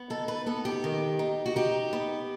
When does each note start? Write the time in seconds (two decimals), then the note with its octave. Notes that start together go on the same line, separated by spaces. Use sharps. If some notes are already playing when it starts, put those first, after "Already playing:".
Already playing: B3
0.10 D#4 A4
0.28 B4
0.46 B3 A4
0.65 G4
0.84 D#3
1.19 D#4
1.46 F#4
1.56 D#4 G4
1.93 B3